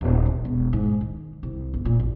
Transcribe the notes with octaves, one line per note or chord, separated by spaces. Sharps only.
D#1
C3
E1
G#2
D#3
C2
G1
A#2
A1